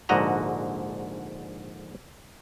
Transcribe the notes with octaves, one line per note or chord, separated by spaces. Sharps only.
A#1 G#2 D3 F#4 D#5 A#5